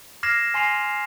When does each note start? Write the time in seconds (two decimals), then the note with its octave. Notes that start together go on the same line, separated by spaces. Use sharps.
0.23 D6 F6 G#6 A#6 C7 E7
0.54 G#5 C6 A#6 C7 F7